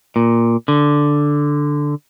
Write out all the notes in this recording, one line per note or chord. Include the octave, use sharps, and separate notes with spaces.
A#2
D3